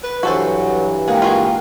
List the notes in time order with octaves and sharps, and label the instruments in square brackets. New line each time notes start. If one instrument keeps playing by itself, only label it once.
[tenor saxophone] B4
[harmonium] G2 E3 [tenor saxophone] F#3 [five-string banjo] F#4 A4 C5
[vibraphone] G#3 G5 [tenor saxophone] A#3 [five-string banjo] G#4 F#5
[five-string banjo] F4 F#4 G#4